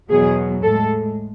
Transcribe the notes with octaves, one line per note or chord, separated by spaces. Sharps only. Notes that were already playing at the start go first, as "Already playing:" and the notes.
E2 B2 F#3 G#4
A2 G#3 A4